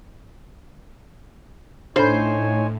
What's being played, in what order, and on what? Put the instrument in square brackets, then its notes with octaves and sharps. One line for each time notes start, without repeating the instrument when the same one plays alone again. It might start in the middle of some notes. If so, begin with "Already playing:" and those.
[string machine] A2 [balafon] D4 A4 B5 [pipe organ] D#4 C#5 G#5 [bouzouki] C5